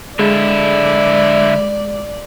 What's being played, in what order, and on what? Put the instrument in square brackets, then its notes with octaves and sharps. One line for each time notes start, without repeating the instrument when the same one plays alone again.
[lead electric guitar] D3 E4 [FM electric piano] G#3 [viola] D5